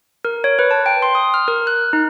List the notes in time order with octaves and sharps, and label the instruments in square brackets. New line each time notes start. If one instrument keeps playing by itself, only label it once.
[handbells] A#4
C#5
B4
A5
G5
C6
D#6
F6
A#4
F#6
D#4